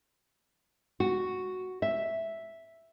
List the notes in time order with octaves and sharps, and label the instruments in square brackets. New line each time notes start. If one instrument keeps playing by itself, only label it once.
[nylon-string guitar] F#4
E5